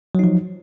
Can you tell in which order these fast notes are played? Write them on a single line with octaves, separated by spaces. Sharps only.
F#3 D#4 F3